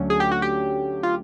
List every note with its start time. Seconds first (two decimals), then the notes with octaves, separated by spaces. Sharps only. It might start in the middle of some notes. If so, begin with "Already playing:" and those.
Already playing: D2 D3 F#3 A3 C#4
0.10 G#4
0.20 G4
0.31 F#4
0.42 G4
1.03 F4